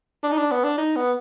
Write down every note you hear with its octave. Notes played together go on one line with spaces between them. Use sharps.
D4
D#4
D4
B3
D4
D#4
B3